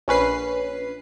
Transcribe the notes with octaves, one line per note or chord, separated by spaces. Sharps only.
A#1 C#4 B4 C7